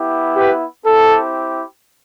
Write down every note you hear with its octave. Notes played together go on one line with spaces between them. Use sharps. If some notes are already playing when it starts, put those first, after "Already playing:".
Already playing: B3 E4 G4
G4 B4
C4 E4 G4 A4